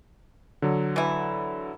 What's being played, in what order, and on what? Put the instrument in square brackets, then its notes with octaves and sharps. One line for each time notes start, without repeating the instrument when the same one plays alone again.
[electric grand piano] D3 F#3
[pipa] E3 E4